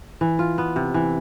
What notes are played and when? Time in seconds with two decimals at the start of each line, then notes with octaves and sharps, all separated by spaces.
0.21 E3
0.39 F4
0.58 B3
0.76 C3
0.94 E3